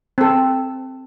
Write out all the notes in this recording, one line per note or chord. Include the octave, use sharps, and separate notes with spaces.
C4 A4